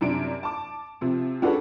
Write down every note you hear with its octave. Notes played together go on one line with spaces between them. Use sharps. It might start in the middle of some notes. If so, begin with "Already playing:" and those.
F#2 C3 D4 D7
A5 D6
C3 F3 C4
C#4 D4 F#4 G#4 A4 B4